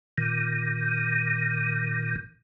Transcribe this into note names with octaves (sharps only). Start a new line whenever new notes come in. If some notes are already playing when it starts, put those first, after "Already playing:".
A#2 D#3